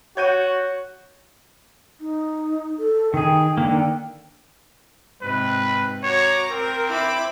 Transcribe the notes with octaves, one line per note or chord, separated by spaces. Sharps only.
F#4 C#5 G6 D#7
D#4
A4
D#3 G#4 G5
D3 D#3 A#3
G#2 C3 B4
F#4 C#5 A#5 D6
C4 A#4
E4 B5 D6